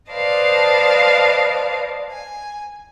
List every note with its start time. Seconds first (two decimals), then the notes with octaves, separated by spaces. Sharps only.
0.11 B4 C5 D5 D#5 F5 A5
2.10 G#5